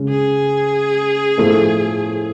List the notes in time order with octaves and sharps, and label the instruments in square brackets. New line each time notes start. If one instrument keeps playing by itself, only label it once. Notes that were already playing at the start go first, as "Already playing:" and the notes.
Already playing: [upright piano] C#3 G#3 C#4
[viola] G#4
[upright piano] A2 F3 A3 F4 A4